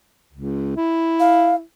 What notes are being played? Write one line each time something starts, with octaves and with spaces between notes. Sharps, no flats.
C#2
E4
F5